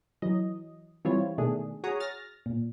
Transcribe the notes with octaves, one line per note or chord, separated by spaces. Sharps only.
E3 F#3 D#5
E3 G3 C4 E4 F4 C#5
B2 D#3 A3 D4 G#4
F#4 G#4 C#5 F#5 A#5 D#6
F6 A6 A#6
A#2